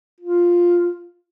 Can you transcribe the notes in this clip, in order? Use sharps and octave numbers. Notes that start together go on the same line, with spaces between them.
F4